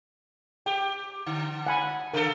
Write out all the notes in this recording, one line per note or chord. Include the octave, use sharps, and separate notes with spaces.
G4 G5
D3
F#5 G#5 B5
C#3 A4 A#4